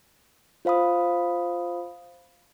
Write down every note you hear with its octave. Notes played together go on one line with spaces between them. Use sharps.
F4 C5 F5 B5 D#6